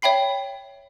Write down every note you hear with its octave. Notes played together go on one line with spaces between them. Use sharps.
C#5 E5 G5 B5 C7